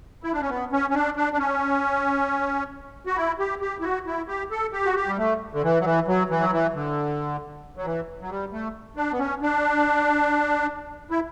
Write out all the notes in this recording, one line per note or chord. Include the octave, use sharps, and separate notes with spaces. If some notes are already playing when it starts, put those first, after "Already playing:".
E4
D4
C#4
B3
C#4
C#4
D4
D4
D4
C#4
F#4
E4
G4
G4
E4
F#4
E4
G4
A4
G4
F#4
G4
G3
A3
D3
E3
F#3
E3
F#3
E3
F#3
E3
D3
F#3
E3
F#3
G3
A3
D4
B3
C#4
D4
E4